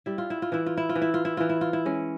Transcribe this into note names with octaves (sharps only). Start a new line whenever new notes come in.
G3 E4
F4
E4
F4
E3 E4
F4
E4
F4
E3
E4
F4
E4
E3 F4
E4
F4
E4
G#3 C#4